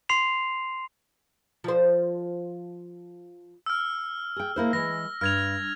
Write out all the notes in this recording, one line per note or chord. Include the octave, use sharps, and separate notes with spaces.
C6 C7 F7
F3 C5
E6 F6
G#4 G5
A#3 E4 C5
E3 G#3 A#6
G2 F6 G#6 F7